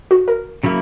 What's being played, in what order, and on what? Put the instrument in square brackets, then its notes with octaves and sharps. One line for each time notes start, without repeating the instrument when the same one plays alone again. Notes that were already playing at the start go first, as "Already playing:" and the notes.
[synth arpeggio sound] F#4
A#4
[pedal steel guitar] C#3 F#3 A#3 E4